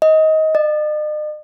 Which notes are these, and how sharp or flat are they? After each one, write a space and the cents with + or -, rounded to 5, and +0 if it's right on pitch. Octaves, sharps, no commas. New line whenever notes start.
D#5 +20
D#5 -45